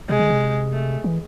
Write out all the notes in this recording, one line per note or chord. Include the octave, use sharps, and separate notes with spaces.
C3 G#3
D3
C3
A3
E3